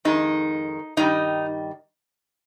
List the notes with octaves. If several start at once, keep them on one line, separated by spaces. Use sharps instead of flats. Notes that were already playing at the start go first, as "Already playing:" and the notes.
F2 D#3 G#3 D#4
G2 D#3 G3 D#4